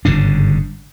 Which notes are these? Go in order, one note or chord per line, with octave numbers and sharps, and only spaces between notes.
G1 G#2 C#3 D4